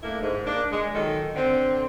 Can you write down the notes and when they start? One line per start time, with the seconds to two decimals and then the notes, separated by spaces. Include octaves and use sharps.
0.03 A3 A#3 D4 E4
0.22 G#2
0.46 A#3 D4
0.71 G#3
0.94 A#2 D#3 F#3 A4
1.36 D3 C4